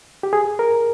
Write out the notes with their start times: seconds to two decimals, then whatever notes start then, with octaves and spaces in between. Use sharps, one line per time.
0.23 G4
0.33 G#4
0.59 A#4